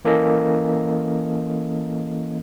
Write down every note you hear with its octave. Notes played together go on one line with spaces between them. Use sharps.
E3 A#3 C#4 A4 A#4 D#5